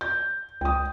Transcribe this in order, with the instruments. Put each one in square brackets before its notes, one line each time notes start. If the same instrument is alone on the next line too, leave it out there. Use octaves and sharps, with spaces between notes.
[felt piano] G6
[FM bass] C#2 [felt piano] G5 D#6